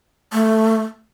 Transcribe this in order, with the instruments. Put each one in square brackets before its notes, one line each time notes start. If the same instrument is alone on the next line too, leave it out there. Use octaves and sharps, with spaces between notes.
[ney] A3